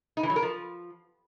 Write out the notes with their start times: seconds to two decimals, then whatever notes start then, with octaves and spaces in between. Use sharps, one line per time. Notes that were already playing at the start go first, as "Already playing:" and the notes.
0.17 D#4
0.23 E3
0.30 F#3
0.36 A#4
0.42 F3